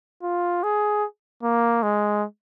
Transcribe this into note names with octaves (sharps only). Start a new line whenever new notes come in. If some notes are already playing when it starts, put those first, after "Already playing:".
F4
G#4
A#3
G#3